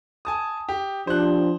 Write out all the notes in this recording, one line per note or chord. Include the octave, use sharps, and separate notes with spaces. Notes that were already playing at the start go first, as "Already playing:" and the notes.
G#5 A5 D#6
G4
F3 D4 G4 C5 F#6